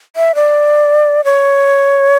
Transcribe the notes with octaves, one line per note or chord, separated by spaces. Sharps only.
E5
D5
C#5